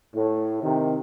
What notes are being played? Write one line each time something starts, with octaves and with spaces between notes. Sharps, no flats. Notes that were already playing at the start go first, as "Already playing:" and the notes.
A2
C3 D#3